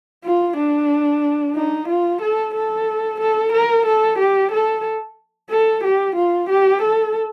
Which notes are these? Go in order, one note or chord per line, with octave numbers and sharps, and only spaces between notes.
F4
D4
D#4
F4
A4
A4
A4
A#4
A4
G4
A4
A4
G4
F4
G4
A4